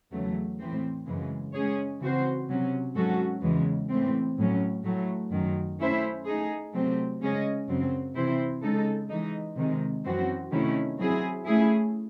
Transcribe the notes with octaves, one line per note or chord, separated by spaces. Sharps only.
E2 C#3 F#3 A3
A2 E3 C4
F#2 C#3 E3 G#3
G#3 C#4 G#4 C#5
C#3 E3 C4 F#4 C5
C3 F#3 C#4
G#2 F#3 C#4 F#4 A4
E2 C#3 E3 G#3
A2 E3 C4
A2 F#3 C#4
A2 F#3 A3
F#2 D#3 F#3
A3 C#4 E4 C5 E5
A3 D#4 G#4
C3 F#3 A3 C4
C#3 G#3 C#4 G#4 D#5
F#2 C#3 F#3 C4
C3 E3 C4 E4 C5
C#3 G#3 D#4 A4
E3 G#3 D#4
C3 D#3 G#3
F#2 E3 C4 F#4
C3 D#3 A3 C#4 E4
F#3 C4 E4 G#4
A3 C#4 E4 G#4